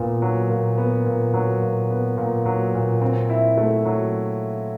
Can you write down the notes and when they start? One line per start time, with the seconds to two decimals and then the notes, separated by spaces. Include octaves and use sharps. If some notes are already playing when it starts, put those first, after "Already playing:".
Already playing: A#2 B3
0.22 F#3
0.50 A#2
0.77 B3
1.06 A#2
1.34 F#3
1.62 A#2
1.90 B3
2.18 A#2
2.46 F#3
2.74 A#2
3.02 C4
3.30 E4
3.58 A3
3.85 F#3